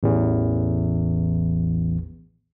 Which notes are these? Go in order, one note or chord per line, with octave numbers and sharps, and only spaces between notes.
A1 E2